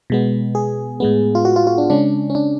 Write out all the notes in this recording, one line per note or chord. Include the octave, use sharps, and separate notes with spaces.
B2 G#3 B3
G#4
A2 G#3 B3
F4
F#4
F4
F4
D4
C#3 G#3 C#4 D4
C#4
D4